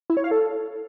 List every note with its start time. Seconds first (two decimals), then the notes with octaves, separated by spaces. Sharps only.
0.10 E4
0.17 C#5
0.24 F5
0.31 A4